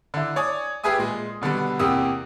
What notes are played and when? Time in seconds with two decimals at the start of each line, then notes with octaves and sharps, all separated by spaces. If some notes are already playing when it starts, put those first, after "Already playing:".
0.14 D3 E4
0.36 C#5 D5 G#5 D#6
0.84 G4 G#4 B4 E5 G#5 D#6
0.98 A#2 G#3
1.41 B2 D3 G3 B3
1.79 E2 C3 A#3 G4 D#6 E6